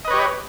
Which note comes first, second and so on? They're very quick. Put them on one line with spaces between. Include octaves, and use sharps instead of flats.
D#5 B4 C#5 G4